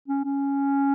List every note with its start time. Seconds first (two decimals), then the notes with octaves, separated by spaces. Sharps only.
0.08 C#4
0.24 C#4